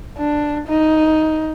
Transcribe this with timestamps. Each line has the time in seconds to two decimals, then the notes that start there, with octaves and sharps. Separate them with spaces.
0.18 D4
0.68 D#4